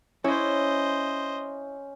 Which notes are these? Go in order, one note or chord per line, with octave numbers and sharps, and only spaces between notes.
C#4 E4 C5 C#5 D#5